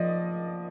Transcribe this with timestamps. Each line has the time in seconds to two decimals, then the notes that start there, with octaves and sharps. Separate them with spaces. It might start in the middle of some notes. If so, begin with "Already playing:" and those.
Already playing: F3 D5 D#5